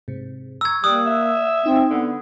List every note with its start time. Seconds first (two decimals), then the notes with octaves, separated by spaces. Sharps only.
0.08 G#2 C3
0.61 A#5 C#6 E6 G#6
0.84 G3 A#3 D#6 E6 F#6
1.06 E5
1.66 C4 D#4
1.90 D3 B3